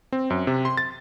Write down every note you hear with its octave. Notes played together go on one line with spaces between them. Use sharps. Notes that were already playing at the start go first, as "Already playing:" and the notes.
C4
F#2
C3
C6
A6